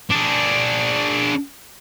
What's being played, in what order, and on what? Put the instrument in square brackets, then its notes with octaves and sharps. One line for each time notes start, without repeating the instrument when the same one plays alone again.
[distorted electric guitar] D4 G#4